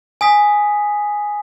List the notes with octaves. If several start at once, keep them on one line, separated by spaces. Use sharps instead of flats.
G#5 D#6 B6